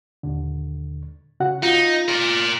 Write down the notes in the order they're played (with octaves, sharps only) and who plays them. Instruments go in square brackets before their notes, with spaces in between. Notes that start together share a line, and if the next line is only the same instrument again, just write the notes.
[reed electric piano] D#2 A#2 D3
C#3 F#4 F#5
[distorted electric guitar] D#4 [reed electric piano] F4
[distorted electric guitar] A#4 D5